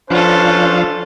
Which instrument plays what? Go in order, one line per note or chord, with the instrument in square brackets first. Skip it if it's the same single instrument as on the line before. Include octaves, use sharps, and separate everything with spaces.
[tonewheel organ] F3 D4 F5 [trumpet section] C#4 B4 C5 [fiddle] F4 A4